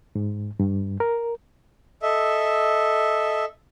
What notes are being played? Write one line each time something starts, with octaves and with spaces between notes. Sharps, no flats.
G#2
G2
A#4
A4 D#5 E5